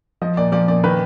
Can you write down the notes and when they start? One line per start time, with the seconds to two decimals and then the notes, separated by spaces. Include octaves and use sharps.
0.22 F3 D#5
0.37 A#2 D5
0.52 F3 D5
0.68 A#2 D5
0.84 D#3 B4